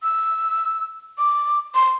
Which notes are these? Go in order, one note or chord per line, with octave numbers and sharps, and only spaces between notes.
E6
D6
C6